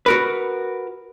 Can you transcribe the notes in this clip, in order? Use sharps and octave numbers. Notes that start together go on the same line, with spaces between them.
F#4 A#4 B4